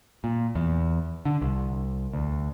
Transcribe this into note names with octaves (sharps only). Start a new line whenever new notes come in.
A#2
E2
D3
C2
D2